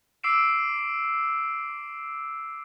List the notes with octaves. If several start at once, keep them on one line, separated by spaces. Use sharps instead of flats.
D6 E6 C7 D7 E7